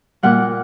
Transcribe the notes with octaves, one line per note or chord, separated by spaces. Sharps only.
A#2 G3 F#5